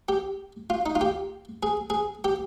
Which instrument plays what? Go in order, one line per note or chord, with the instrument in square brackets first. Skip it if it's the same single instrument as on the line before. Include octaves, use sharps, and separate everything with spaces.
[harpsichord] G4
F4
D#4
F4
G4
G#4
G#4
G4